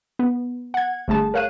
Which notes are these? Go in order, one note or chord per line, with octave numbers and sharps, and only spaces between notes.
B3
F#5 G#6
G1 A3 G#4 A5
A#4 C#5 F5 F#6 D#7